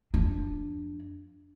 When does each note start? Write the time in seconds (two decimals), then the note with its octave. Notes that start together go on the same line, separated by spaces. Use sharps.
0.14 F2 D4